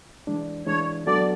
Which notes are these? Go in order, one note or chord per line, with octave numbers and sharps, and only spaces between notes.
E3 G#3 D4
E3 G#3 D4 C#5
F#3 B3 D4 F#4 A4 D5